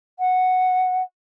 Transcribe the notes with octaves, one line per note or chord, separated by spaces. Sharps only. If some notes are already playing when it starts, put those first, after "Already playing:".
F#5